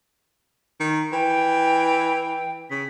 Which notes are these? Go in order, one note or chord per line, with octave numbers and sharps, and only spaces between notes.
D#3
E3 G5
C#3 B6